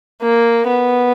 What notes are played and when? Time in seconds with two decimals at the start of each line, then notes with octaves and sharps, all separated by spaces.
0.21 A#3
0.68 B3